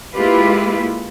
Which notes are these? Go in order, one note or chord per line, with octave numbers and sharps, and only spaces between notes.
G#3 A#3 E4 F4 G4 B4